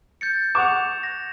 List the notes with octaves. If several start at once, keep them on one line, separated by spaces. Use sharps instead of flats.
G6 A6 C#7
F#5 C#6 D6 E7 F7
A#6